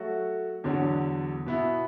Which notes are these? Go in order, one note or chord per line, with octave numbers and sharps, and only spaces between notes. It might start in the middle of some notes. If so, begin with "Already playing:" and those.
Already playing: F#3 A3 F#4
E2 D3 F#3 D4
B2 B3 E4